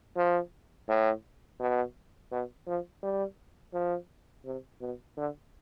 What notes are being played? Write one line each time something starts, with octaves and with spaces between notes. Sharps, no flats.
F3
A2
B2
B2
F3
G3
F3
C3
B2
D3